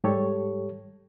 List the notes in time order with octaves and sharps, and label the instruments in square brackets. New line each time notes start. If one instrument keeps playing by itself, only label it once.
[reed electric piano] G#2 G3 G4 A4 C#5